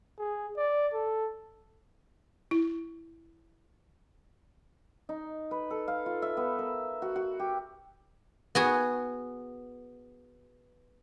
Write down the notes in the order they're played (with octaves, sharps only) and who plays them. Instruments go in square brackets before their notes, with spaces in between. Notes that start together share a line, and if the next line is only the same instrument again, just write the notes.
[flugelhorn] G#4
D5
A4
[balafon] E4
[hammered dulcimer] D#4
B4
A4
F5
F4
E5
B3
A#4
F#4
F#4
G4
[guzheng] B3 F#4 G#4